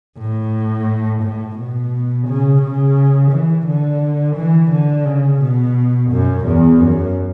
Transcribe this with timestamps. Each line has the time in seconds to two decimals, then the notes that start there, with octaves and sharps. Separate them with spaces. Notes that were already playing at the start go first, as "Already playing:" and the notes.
0.18 A2
1.22 A2
1.58 B2
2.28 C#3
2.62 C#3
3.32 E3
3.67 D3
4.36 E3
4.72 D3
5.05 C#3
5.41 B2
6.11 F#2
6.45 E2
6.79 F#2